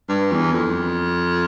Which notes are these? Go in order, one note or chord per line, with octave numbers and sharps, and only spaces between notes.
G2
E2
F2